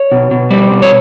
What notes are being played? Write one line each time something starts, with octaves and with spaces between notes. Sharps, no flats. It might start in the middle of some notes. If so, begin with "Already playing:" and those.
Already playing: C#5
B2
B2
G3
B2
C#5